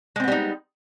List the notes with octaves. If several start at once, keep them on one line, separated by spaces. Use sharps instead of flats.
G3 G#3 B3 C4 D#4